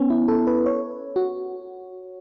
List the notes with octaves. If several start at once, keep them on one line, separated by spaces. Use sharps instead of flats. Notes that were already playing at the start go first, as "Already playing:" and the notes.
Already playing: B3 C#4
E4
A4
B4
C#5
F#4